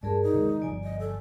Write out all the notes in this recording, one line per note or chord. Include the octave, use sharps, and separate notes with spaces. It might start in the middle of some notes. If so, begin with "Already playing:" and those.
G2 G3 G#4 A#4 D5 A5
D#4
C3 D#3 G#3
G1 F3 G3 D5 G#5
D#5
A4